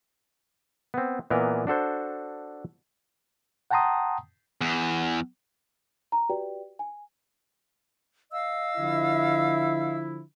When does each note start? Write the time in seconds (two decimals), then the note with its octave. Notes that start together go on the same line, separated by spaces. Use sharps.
0.94 B3 C4
1.30 A#2 E3 B3 A#4 D#5
1.67 D4 F#4 A4 C5
3.71 F#5 G5 A5 A#5 C6 D#6
4.61 E2
6.12 A#5
6.29 F#4 G4 B4 D5 G5
6.79 G#5
8.32 D#5 F5 E6
8.78 D3 F3 E4